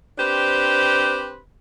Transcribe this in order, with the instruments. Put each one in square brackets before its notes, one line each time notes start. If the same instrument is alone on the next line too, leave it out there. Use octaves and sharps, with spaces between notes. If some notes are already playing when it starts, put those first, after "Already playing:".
[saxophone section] C4 D4 G4 B4 C5